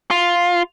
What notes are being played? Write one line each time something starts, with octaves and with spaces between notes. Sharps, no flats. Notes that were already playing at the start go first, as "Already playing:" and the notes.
F4